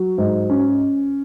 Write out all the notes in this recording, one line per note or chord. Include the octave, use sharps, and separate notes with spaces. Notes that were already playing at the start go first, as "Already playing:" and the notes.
Already playing: F#3
G#2
C#4